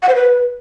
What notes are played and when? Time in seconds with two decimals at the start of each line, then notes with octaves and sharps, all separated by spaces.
0.03 F#5
0.09 C5
0.15 B4